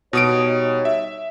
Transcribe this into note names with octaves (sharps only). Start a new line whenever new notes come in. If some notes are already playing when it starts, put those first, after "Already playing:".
B2 G3 D#4 C#5 D#6 D7
E5